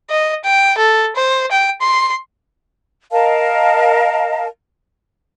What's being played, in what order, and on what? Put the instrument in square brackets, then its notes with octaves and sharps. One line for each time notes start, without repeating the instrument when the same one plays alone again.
[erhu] D#5
G5
A4
C5
G5
C6
[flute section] A#4 D#5 F5 A5